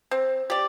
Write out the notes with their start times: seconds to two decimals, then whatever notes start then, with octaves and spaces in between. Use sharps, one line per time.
0.11 C4
0.50 G4 D5